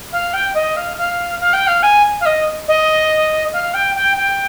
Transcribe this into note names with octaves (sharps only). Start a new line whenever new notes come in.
F5
G5
D#5
F5
F5
F5
G5
F5
G#5
F5
D#5
D#5
F5
G5
G5
G5